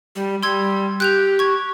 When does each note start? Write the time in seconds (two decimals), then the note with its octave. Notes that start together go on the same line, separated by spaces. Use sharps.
0.16 G3
0.43 G3 C6 E6 G#6
1.00 G4 F#6 G6 F7
1.39 C#6 G#6